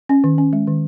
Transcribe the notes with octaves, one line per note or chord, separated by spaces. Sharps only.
C#4
D#3
C#4
G#3
D#3